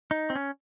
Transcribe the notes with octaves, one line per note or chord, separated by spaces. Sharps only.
D#4
C4
C#4